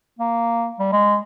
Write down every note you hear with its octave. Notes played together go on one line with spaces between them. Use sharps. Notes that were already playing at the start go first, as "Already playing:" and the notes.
A#3
G3
G#3